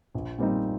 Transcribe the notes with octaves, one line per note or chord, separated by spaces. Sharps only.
A#1
A#2 G3 C4 D#4